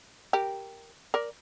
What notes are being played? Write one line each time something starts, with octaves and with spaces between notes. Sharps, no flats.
G4 A#4
A#4 D5